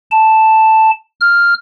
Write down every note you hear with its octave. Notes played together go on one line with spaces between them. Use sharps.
A5
F6